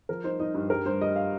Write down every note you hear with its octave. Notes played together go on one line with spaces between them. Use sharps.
F3 A#4
D#4 C5
D#4 D#5
G2
G3 A#4
G2 C5
G3 D#5
F5